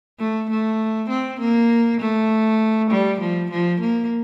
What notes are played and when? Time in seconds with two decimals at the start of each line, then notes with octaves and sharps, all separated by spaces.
0.20 A3
0.50 A3
1.10 C4
1.40 A#3
2.01 A3
2.91 G3
3.20 F3
3.51 F3
3.80 A#3